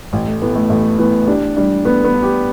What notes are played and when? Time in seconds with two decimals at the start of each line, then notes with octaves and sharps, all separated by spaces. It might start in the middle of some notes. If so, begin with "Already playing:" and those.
0.13 A1
0.28 A3
0.42 A2 B3
0.55 A3
0.70 A1 A3
0.99 E3 B3
1.27 D4 G4
1.57 G3 D4
1.85 A2 B3
2.05 B3
2.14 D4
2.23 G4